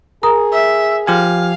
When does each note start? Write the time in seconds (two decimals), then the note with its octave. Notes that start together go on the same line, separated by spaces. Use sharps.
0.23 G#4 A#4 A#5 D#6
0.52 E5
1.07 F3 G4 F5 G#5